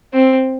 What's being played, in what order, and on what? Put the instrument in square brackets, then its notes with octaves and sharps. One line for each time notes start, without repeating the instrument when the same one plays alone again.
[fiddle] C4